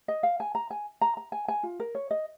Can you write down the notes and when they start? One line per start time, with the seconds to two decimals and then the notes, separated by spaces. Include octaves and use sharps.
0.08 D#5
0.23 F5
0.40 G#5
0.55 A#5
0.71 G#5
1.01 A#5
1.17 A#5
1.32 G#5
1.48 G#5
1.63 F4
1.80 A#4
1.95 C#5
2.11 D#5